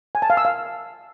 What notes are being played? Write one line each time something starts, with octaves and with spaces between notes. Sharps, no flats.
G#5
A5
F5
E6
F5